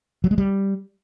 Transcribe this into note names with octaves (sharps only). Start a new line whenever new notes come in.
F#3
G#3
G3